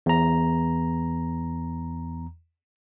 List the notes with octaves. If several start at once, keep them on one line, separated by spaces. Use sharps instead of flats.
E2 A#5